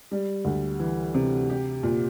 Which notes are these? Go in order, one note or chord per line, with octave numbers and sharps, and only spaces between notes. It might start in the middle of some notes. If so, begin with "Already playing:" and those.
G3
D2
E3
C3
G4
A#2